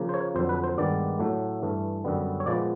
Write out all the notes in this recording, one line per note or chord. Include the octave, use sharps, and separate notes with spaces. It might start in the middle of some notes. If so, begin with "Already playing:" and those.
Already playing: C#3 F3 A#3
C5
C#5
F2 D3 F#3 C5
B4
C5
G2 D#3 G#3 B3 D5
A2 F#3 A3
G2 E3 A3
F#2 D3 G3 B3
C#5
A#2 F3 G#3 B3 D5